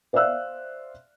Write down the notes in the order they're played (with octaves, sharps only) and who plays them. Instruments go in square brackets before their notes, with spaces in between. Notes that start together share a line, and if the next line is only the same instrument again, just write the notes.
[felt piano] C5 D5 E5 F5 E6 F#6